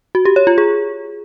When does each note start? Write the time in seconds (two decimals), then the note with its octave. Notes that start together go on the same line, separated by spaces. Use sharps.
0.15 F#4
0.25 G4
0.36 C#5
0.47 F4
0.58 G#4